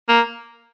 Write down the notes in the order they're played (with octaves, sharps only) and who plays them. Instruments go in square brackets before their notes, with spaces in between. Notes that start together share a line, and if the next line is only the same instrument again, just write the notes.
[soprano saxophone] A#3